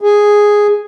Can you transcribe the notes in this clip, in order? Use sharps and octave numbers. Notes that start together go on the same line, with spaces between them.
G#4